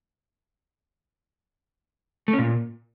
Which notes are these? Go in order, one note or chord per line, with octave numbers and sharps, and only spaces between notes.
A3
C#4
A#2